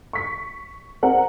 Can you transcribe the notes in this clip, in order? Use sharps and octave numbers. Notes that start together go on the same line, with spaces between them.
C#6 B6
C4 A#4 F#5